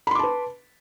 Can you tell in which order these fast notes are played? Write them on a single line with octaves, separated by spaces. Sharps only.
B5 C6 D6 A5 B4